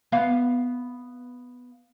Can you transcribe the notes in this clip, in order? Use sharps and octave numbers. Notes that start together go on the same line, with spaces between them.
B3 F5